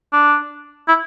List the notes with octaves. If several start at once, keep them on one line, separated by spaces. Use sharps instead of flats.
D4
E4